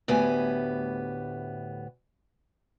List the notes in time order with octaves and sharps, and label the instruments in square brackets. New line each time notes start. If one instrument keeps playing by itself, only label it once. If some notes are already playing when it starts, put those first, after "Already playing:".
[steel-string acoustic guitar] D2 A2 B3 G4 G#5